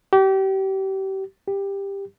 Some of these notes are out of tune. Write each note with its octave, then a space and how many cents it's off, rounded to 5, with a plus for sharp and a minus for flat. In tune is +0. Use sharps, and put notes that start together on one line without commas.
G4 -30
G4 +15